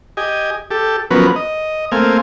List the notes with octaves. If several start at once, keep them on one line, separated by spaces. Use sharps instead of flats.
G4 D#5 G#5
G4 A4
F3 F#3 B3 C#4 A#4 B4
D#5
A3 A#3 C4 F5 G#5